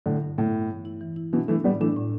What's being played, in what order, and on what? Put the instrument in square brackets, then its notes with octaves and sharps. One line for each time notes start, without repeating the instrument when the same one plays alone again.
[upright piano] A2 D3 [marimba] E4
[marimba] G2
[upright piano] A2 [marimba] B3
[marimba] G2
E3
E4
E3
E4
[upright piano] B2 E3 [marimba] D4
[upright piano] E3 A3 [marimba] D4
[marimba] A2 [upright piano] G3 B3
[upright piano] E3 A3 [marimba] D4
[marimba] A2